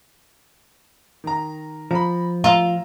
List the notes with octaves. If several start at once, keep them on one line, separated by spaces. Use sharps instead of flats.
D#3 A#5
F3 A#5 B5
F4 A#5 E6 F6